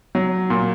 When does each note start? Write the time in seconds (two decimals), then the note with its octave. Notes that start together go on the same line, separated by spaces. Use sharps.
0.15 F#3
0.50 A#2